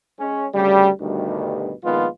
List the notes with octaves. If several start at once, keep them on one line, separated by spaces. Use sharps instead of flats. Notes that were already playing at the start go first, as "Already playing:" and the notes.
G#3 C#4
D2 C#3 G3
D2 G2 B2 D#3 G3
A#1 D#3 G#3 B3 F4